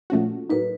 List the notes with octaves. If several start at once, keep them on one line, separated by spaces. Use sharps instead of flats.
A#2 F3 A3 C#4 F#4
A2 F#3 A#3 D#4 B4